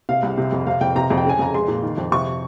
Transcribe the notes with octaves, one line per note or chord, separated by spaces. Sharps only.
C3 F5
C2
C3
F2
C3 F5
F2 G5
C3 A#5
F2
G5
C#3 G#5
F2 A#5
G#3 C6
A#2
D#3
F2
C3 C#6